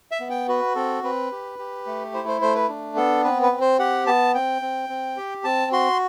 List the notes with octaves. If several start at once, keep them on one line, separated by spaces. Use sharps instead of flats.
E5
B3
G5
F#4 B4
C4 A4
C4 B4
G4
G4
A3
E4 C5
C5
A3 C5
B4
D4
B3 A4
C4 B4
B4
C4
C5
G4 F#5
B3 A5
C4 G5
C4
C4
G4
C4 A5
F#4 C6